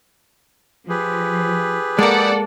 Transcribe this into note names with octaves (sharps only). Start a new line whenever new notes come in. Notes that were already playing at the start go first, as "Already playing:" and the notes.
F3 G4 G#4 B4
G#3 A#3 A4 D5 F#5